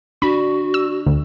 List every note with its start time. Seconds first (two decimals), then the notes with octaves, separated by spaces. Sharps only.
0.22 D4 F#4 B5
0.74 E6
1.07 D2